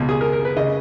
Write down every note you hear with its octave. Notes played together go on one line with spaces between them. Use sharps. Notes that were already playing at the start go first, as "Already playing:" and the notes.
Already playing: C#2 B2
G#4
A#4
A#4
B4
C#3 D#5